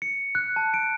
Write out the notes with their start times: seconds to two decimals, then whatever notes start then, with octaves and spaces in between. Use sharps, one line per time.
0.02 C#7
0.35 F#6
0.56 A5
0.74 D7